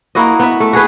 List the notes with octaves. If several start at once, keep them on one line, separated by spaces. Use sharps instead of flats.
A#3 E4 F#4 D#5
B3 E5
A3
F#4 G#4 B4